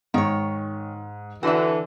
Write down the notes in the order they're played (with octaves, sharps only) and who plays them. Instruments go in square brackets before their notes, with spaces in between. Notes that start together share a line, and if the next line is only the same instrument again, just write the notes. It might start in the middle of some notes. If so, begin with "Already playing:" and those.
[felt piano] G#2 [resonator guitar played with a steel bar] D#3 C#5
[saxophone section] D3 E3 [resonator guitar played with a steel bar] F#4 E5